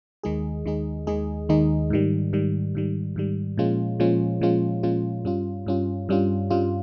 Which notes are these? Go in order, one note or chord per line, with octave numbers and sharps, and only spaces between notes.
D#2 D#3 G#3 D#4 G#4
D#2 D#3 G#3 D#4 G#4
D#2 D#3 G#3 D#4 G#4
D#2 D#3 G#3 D#4 G#4
G#2 D#3 G3
G#2 D#3 G3
G#2 D#3 G3
G#2 D#3 G3
A#2 F3 G#3 C#4 F4
A#2 F3 G#3 C#4 F4
A#2 F3 G#3 C#4 F4
A#2 F3 G#3 C#4 F4
G2 G3 C#4 F4
G2 G3 C#4 F4
G2 G3 C#4 F4
G2 G3 C#4 F4